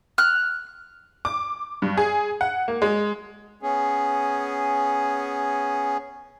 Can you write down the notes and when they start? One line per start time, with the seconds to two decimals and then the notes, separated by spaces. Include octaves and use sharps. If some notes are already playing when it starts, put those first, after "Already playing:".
0.18 F6 F#6
1.25 D6
1.82 G2
1.97 G#4
2.41 F#5
2.68 A#3
2.82 G#3
3.63 B3 C#4 G#4